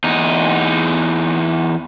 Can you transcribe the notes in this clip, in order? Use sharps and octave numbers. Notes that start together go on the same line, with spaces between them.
E2 D#4